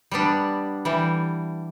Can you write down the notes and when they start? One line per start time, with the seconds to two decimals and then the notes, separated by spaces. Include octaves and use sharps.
0.11 G3 B3 D4
0.85 E3 G3